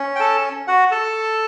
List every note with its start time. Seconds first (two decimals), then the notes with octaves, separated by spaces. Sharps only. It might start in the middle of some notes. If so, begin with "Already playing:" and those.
Already playing: C#4
0.16 G5
0.20 A4 A5
0.67 F#4 F#5
0.91 A4 A5